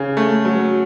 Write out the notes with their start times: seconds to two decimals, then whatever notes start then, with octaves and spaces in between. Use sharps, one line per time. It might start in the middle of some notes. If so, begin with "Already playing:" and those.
Already playing: C#3
0.17 A3
0.45 F#3